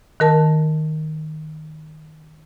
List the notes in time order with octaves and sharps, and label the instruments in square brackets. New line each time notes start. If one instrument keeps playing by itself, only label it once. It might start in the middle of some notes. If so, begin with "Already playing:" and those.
[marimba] D#3 A#4 A5